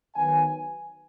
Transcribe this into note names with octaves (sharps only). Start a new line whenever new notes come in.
D#3 F#3 B3 G#5